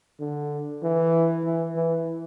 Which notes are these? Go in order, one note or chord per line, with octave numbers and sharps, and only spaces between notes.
D3
E3
E3
E3